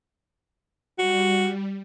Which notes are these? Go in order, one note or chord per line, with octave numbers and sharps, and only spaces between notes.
G3 F#4